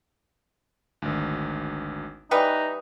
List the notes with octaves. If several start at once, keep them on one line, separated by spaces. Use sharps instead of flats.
G#1 D2
E3 G3 D#4 B4 E5